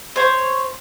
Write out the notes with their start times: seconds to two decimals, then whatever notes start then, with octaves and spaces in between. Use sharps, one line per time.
0.16 C5 C#5